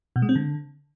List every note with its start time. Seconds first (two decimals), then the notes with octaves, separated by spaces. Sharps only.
0.16 B2
0.22 G#3
0.29 C4
0.35 D3